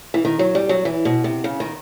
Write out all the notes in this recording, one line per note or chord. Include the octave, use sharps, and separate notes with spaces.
E3
D#3
F#3
G3
F#3
E3
B2
C3
C#3
D#3